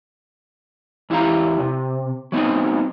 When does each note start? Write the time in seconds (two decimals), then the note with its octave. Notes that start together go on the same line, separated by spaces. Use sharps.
1.10 E2 E4 G4 F5 A#5
1.60 C3
2.32 F#3 B3 C4 D#4